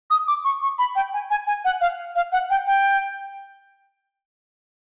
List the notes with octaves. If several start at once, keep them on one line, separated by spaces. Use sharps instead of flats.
D#6
D6
C#6
C#6
B5
G5
G#5
G#5
G#5
F#5
F5
F5
F#5
G5
G5